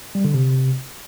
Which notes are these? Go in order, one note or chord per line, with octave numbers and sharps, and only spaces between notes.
G3
D3
C3